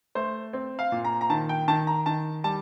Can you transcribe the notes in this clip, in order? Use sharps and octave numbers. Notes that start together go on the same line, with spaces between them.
A3 C5
C4
F5
A#2
A#5
A#5
D#3 A5
G5
D#3 A5
A#5
D#3 A5
G3 A5